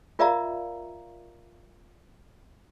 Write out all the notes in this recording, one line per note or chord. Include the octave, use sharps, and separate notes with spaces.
F4 A#4 D5 E5 F5 A#5